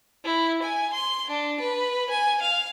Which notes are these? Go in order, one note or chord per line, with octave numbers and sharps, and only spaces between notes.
E4
G#5
C6
D4
B4
G#5
F5